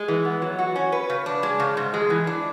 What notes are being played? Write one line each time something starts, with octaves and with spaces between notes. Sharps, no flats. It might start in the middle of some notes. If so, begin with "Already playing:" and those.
Already playing: G#3
E3
B3
F#3
F#4
C#4
B4
C#3
D4
G#3
C#3
G#2
G#3
E3
D4